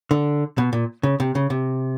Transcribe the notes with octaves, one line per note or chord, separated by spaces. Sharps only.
D3
B2
A#2
C#3
C3
C#3
C3